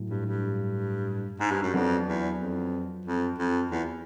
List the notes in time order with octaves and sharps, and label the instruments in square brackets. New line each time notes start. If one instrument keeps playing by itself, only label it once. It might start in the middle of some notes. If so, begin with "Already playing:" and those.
Already playing: [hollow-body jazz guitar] A2 F#3
[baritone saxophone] G2
G2
G#2
G2
F#2
[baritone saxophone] F2 [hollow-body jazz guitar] F#3 B3 D4
[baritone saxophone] E2
F2
F2
F2
E2